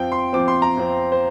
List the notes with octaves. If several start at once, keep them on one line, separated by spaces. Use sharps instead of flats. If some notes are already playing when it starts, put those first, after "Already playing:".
Already playing: F2 F3 C4 G5
C6
F2 F3 C4 D6
C6
A#5
F2 F3 C4
C5